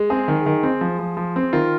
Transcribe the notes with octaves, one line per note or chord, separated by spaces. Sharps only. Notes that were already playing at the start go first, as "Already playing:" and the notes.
Already playing: G#3
C4 G#4
D#3
D#3
C4
F3
F3
F3
C4
D#3 F4 A#4